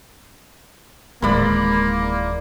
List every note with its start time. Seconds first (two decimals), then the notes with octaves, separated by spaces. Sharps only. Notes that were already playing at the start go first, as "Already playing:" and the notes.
1.22 D1 D#3 E3 G#3 A#3 D5 B5 C6